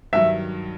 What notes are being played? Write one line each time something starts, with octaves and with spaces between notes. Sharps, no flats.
G2 D#3 F#3 E5